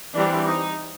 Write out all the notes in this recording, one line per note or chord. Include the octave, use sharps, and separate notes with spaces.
E3 G3 C4 D4
D#4